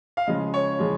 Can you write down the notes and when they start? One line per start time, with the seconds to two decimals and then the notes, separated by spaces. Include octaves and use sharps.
0.17 F5
0.27 C#3 F3 G#3 D#5
0.54 C#5
0.79 C#3 F3 G#3